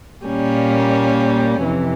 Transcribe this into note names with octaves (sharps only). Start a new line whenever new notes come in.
A#2 G3 A#3 C#4
F2 C3 E3